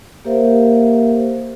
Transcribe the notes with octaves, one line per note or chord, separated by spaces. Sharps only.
A#3 G4 A#4 C5 E5 F5